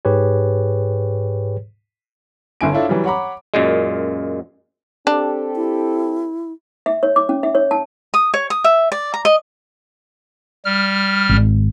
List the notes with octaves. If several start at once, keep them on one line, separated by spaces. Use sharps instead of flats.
G#2 G4 G#4 B4 C#5
G1 E4 G#5 D7
D4 E4 F4 A4 C#5
E3 F#3 G3
C#5 F#5 A#5 B5 D6
F#2 A#2 G#3
C4 D4 G4 A4
E4
E5
C#5
D6
C#4
E5
C#5
A5
D#6
C#5
D#6
E5
D5
A#5
D#5
G3 F6
G#1